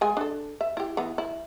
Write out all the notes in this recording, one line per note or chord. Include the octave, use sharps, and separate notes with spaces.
G#3 G#5
D4 A4
E5
E4 G4
E3 B3
E4